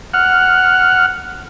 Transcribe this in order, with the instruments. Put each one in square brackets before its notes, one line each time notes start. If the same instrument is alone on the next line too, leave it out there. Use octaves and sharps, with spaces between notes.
[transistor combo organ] F#5 F6